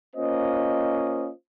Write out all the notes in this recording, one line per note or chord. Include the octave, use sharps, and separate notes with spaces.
A#3 C#4 F4 C5 D#5